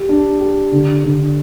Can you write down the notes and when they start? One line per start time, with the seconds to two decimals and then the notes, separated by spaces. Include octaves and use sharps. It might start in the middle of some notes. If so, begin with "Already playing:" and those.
Already playing: G4
0.09 D4
0.40 G4
0.72 D3
1.04 D3